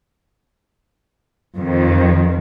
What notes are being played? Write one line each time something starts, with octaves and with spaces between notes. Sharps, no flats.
F2 D#3